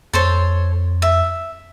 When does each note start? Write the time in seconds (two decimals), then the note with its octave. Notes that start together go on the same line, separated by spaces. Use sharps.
0.13 F2 A4 C5 C#5
1.02 E5